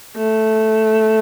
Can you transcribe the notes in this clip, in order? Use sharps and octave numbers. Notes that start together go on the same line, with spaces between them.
A3